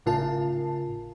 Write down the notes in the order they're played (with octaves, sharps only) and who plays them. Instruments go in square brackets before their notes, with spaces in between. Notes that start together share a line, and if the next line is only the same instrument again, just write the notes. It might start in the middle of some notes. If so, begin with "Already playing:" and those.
[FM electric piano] G#1 A2 C#3 F4 A#4 A5